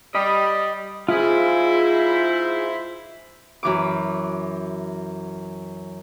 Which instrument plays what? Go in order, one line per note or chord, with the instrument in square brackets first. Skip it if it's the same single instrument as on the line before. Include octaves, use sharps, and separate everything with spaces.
[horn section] G3 [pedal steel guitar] D#5 B5
[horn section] G#2 E4 C5 [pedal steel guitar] F4 G#4
[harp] F#2 E3 D6